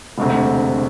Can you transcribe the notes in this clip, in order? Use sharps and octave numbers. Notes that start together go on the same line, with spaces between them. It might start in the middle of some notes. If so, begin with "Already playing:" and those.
E1 D2 C3